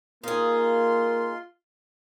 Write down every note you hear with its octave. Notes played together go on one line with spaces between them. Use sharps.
A#3 D#4 F4 G#4 C6